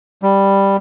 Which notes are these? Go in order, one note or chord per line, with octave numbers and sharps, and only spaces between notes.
G3